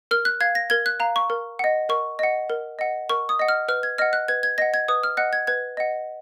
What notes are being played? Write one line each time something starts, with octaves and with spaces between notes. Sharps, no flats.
A#4 F6
F#6
F5 G#6
A#6
A#4 G#6
F#6
F5 A#5
C#6
A#4
D#5 F#5
A#4 C#6
D#5 F#5
A#4
D#5 F#5
A#4 C#6
D#6
D#5 F#5
F6
B4 F6
G#6
D#5 F#5 F6
F#6
B4 G#6
G#6
D#5 F#5 A#6
G#6
B4 D#6
F6
D#5 F#5 F#6
G#6
B4 G#6
D#5 F#5